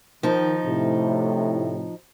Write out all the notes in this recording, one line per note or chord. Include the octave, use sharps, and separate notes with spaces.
D#3 F3 D#4
A2 C3